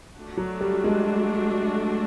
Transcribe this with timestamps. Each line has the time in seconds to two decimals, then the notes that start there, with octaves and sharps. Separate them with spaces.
0.15 A3 D4 F#4
0.37 F#3
0.61 G3
0.84 G#3